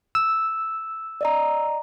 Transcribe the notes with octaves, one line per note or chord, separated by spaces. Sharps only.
E6
D5 D#5 A#5